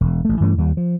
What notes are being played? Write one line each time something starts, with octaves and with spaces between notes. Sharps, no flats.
E1
A1 A3
G2 E3 A3 C#4
D#2 G3
F3